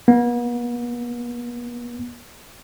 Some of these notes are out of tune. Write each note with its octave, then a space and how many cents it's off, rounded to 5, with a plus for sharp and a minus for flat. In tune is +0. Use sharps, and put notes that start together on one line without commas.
B3 -45